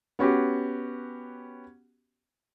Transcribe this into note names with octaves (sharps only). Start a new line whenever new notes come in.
B3 C#4 F#4 G4